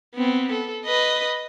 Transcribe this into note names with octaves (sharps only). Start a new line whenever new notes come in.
B3 C4
A4
B4 D#5